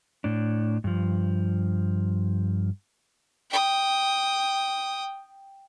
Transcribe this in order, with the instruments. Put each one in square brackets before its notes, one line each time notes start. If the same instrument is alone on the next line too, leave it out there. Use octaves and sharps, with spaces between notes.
[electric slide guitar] A2 D4
G2 F3
[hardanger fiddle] G5 D#6